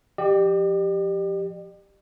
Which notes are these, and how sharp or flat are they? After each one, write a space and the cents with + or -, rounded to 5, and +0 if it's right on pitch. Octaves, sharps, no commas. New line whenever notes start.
F3 +0 G4 +0 D5 +45